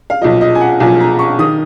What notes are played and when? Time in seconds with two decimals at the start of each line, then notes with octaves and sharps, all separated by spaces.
0.10 F5
0.21 B1 A#2 F3 D#5
0.41 D#5
0.55 G#5
0.61 F#5
0.80 B1 A#2 F3 G#5
1.00 A#5
1.19 C#6
1.39 D#3 D#6